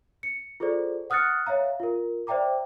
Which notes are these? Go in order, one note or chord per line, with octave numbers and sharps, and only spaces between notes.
C#7
F4 G#4 A4 C5 D5
F#5 D#6 F6 F#6 A6 C#7
C#5 E5 F5 A#5
F4 A#4
C5 D5 E5 G5 A#5 D6